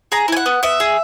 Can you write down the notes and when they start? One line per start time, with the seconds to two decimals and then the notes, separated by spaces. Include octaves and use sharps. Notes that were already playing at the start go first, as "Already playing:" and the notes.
0.12 G#4 A#5
0.28 E4 G#5
0.37 F#5
0.46 B3
0.63 B3 E5
0.80 G#4